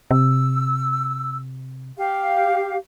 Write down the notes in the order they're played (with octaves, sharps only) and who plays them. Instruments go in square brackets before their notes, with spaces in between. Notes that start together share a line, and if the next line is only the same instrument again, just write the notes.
[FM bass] C3 [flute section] E6
[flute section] G4 F5